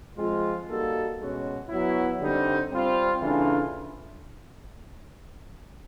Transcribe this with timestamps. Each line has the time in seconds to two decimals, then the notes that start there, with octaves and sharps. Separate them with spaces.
0.18 F3 G#3 C4 F4
0.69 G3 A#3 D#4 F#4 A4
1.19 B2 G#3 C#4 F#4
1.69 F#3 B3 E4
2.20 D3 G3 C4 D#4
2.71 G3 C4 F4
3.21 C#3 E3 A3 D4 F4